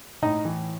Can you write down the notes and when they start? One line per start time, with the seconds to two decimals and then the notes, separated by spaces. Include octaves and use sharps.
0.22 A2 D#4
0.45 E3